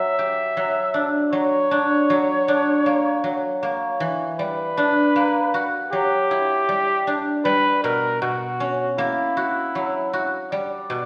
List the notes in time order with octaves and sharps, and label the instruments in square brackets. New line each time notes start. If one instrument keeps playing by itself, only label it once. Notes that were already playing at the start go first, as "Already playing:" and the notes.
Already playing: [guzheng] F#3 [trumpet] E5
[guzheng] G4
F#3
D4
[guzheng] F#3 [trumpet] C#5
[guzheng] D4
F#3
D4
A#3
F#3
[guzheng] A#3 [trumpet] C#5
[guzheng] E3
[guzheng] G3 [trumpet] B4
[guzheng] D4
A#3
F#4
[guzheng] F#3 [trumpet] G4
[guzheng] E4
G3
D4
[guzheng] G3 [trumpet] B4
[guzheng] B2 [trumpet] A#4
[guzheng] B2 [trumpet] F#4
[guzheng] C#4
[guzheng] A#3 [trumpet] E4
[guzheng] F#4
F#3
F#4
[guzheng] G3 [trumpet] D5
[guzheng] B2